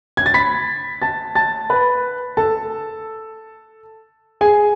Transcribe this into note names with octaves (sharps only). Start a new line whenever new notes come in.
G#6
A6
B5 B6
A5 A6
A5 A6
B4 B5
A4 A5
G#4 G#5